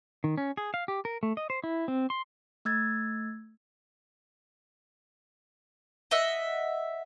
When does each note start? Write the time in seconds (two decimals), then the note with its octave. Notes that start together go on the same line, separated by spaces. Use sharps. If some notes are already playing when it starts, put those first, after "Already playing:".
0.24 D#3
0.38 C#4
0.57 G#4
0.74 F5
0.88 G4
1.05 A#4
1.23 A3
1.37 D#5
1.50 C5
1.64 E4
1.88 C4
2.10 C6
2.65 A3 E6 G#6 A6
6.11 D#5 E5 F#5